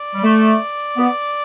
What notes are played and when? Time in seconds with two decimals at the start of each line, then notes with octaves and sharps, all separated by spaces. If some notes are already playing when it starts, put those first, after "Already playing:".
Already playing: D5
0.15 G3
0.22 A3
0.97 B3